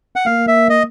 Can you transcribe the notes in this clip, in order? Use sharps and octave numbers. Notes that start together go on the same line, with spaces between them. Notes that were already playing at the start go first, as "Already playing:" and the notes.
F#5
A#3 F5
E5
D#5